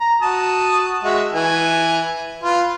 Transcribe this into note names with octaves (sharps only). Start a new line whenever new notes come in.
A#5
F#4 A5 D#6
G#3 F#4 E5
E3 G#5
F4 B4